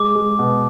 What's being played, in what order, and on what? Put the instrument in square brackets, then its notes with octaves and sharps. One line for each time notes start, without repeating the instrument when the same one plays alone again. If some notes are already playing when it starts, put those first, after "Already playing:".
Already playing: [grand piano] G#3 [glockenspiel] D6
[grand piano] G#3
B2